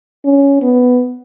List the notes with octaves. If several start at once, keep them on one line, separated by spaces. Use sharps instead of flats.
C#4
B3